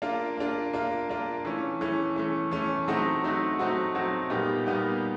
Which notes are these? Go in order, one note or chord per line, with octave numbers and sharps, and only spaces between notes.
A#3 D4 F4
A#3 D4 F4
A#3 D4 F4
A#3 D4 F4
E3 A3 C#4
E3 A3 C#4
E3 A3 C#4
E3 A3 C#4
F#3 A3 C4 D#4 F#4
F#3 A3 C4 D#4 F#4
F#3 A3 C4 D#4 F#4
F#3 A3 C4 D#4 F#4
A#2 G3 B3 D#4 G4
A#2 G3 B3 D#4 G4